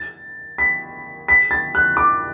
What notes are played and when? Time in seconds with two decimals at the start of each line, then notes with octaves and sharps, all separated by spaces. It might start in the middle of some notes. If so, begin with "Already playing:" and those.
Already playing: A6
0.58 B6
1.28 B6
1.51 A6
1.75 F#6
1.97 D6